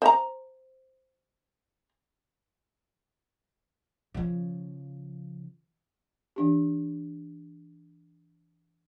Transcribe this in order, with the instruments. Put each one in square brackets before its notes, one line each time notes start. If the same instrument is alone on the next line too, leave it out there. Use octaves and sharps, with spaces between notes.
[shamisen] C5 A#5
[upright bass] C#3 F3
[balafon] E3 D4 G4